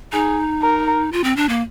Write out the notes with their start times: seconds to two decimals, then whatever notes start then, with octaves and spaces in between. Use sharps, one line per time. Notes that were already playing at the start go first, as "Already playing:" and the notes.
0.12 D#4 G#4
0.62 A#4
1.12 F4
1.24 C4
1.36 D4
1.49 A#3